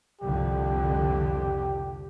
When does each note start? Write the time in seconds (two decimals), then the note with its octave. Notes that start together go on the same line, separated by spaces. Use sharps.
0.21 C2 F2 D3 G4